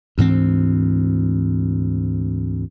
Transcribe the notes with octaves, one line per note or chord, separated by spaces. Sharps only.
D2 G#2 E3 C4